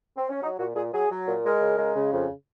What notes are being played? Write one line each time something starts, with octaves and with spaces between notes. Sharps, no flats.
C4
C#4
F#3 D#4
A#2 F#4
A#2 G#4
F#3 G#4
F#3
A#2
G#3 A#4
C#3
G#3
C#3
F2